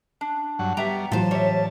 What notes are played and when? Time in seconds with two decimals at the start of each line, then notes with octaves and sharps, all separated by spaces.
0.21 D4
0.59 G2 F#3 F#5
0.77 G3 B3 G4 E5 A#5
1.12 A2 E3 F#3 F4 C5 A5
1.31 G3 C#5 E5